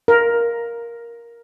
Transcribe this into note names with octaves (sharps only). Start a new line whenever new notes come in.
A#4